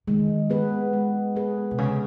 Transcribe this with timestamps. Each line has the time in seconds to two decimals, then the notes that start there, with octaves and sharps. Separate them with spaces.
0.07 D#3 G#3
0.50 B3 G#4 B4
0.93 G#3
1.35 B3 G#4 B4
1.71 B2
1.78 C#3 G#3